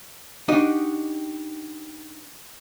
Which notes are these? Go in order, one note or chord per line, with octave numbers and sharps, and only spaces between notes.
D4 D#4 F#4 G4 D#5